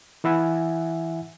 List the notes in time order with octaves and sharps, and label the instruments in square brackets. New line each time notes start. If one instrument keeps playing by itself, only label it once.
[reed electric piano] E3 E4 E5 F#5 G#5